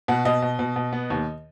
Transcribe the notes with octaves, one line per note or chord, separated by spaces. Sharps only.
B2 F#5
B2 D#5
B2
B2
B2
B3
D#2